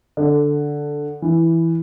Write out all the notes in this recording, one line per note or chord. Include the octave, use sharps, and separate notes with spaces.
D3
E3